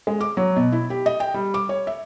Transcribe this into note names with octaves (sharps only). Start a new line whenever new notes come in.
G#3
D6
F#3
B2
E4
G4
D#5
G5
G3
D6
C#5
E5